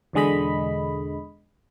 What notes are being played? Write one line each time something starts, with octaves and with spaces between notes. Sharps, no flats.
E2 B2 D3 G#3 D#5 B5